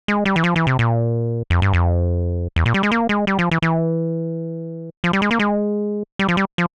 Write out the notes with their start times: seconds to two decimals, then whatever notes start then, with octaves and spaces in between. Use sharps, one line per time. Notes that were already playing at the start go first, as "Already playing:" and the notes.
0.08 G#3
0.25 G3
0.36 E3
0.44 F3
0.56 E3
0.67 C3
0.79 A#2
1.50 F2
1.62 G2
1.74 F2
2.56 E2
2.66 A#2
2.74 G3
2.83 G#3
2.91 A#3
3.09 G#3
3.27 G3
3.39 F3
3.51 E3
3.62 E3
5.04 F3
5.13 G3
5.22 G#3
5.31 A#3
5.39 G#3
6.19 G3
6.28 F3
6.37 G3
6.58 F3